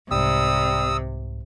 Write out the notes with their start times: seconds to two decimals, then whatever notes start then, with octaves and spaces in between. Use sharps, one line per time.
0.11 C2 G#2 C3 G3 D#6 E6